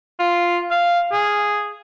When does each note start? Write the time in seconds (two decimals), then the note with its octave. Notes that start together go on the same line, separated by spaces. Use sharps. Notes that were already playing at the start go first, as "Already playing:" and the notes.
0.19 F4
0.71 F5
1.12 G#4